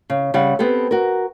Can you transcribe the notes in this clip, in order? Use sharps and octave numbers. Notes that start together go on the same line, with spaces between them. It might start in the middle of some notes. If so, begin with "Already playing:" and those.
C#3
C#3 G3 F#5
B3 C4 G4 A4
F#4 A#4